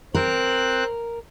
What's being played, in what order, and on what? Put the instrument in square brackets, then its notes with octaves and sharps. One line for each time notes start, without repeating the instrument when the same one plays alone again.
[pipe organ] C4 F#6 [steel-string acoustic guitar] A#4